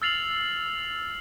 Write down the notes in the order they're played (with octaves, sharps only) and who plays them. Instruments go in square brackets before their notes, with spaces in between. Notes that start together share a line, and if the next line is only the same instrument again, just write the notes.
[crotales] E6 F6 A6 C7 F7 F#7